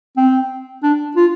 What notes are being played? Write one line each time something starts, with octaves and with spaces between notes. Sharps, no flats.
C4
D4
F4